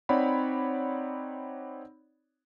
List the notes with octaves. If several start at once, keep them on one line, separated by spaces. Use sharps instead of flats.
C4 D#4 C#5 D5 F#5 B5